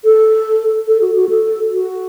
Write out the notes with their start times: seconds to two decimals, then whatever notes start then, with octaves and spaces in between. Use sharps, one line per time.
0.05 A4
0.88 A4
1.01 F#4
1.16 F#4
1.29 A4
1.72 F#4